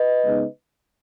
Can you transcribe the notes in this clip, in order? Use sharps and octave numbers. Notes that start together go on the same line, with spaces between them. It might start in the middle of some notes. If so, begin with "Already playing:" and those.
Already playing: B4 D#5
C#3 G#3 B3 D#4